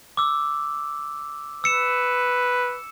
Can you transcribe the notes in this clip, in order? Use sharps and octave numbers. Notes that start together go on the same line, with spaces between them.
D6 E6
B4 E6 C#7 E7